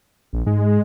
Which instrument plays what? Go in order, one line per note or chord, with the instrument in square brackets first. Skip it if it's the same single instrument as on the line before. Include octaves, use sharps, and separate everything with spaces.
[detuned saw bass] A#1
[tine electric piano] G#2 [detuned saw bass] G#3